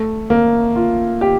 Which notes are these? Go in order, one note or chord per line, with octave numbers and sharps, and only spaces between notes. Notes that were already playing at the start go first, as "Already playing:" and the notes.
Already playing: A3
A#3
F4
G4